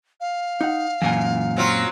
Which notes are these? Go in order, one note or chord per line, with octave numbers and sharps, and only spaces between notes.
F5
D#4 F#5
F#2 A#2 E3 G#5
F#3 C4 F4